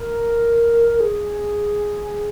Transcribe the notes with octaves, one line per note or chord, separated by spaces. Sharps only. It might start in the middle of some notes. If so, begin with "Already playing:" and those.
Already playing: A#4
G#4